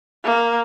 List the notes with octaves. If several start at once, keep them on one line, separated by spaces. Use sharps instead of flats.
A#3